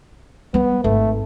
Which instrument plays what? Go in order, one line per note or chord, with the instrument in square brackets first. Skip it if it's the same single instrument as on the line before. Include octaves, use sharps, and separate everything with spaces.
[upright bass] G3 G#3 [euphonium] B3
[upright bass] G#1 [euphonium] A3